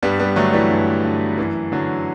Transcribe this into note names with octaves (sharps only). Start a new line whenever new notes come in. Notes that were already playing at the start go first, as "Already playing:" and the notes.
G2 G3 B3
G3 B3
D3 F#3 A3
E3 G3
G2
D3
F#2 E3
D3 F#3